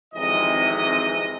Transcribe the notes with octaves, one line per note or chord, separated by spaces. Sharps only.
G#1 F2 G#2 C3 E3 D#5